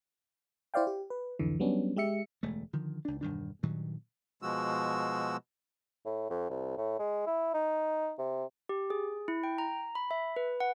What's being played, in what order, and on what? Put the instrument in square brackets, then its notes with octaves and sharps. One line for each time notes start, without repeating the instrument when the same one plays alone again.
[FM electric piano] E4 C5 D5 F5 G5
G4
B4
C2 F2 D3 E3
F#3 G3 B3 C#4 D4
G#3 G4 E5 C#7
[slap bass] E1 D2 G#3 A3
D3 D#3 F3
C#2 D4
E1 G2 D#3 D4
G2 A#2 D#3 F#3
[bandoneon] B2 F3 G#3 F#4 E6
[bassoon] A2
F2
C2
A2
G#3
E4
D#4
C3
[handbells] G4
G#4
E4
G5
A#5
B5
E5
B4
F#5